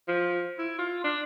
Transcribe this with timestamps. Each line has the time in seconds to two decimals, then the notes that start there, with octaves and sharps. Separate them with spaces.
0.08 F3
0.58 E4
0.79 F4
1.04 D4